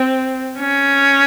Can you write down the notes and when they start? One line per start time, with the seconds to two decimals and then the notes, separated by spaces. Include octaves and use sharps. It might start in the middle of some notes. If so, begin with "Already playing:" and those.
Already playing: C4
0.59 C#4